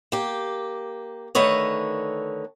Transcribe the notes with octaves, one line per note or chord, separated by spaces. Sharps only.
A#3 G4
D3 D#3 A3 B4 C#5 D#5